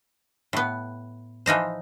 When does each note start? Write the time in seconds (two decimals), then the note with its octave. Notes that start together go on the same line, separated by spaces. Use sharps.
0.53 A2 B3
1.46 E3 F3 D#4 C5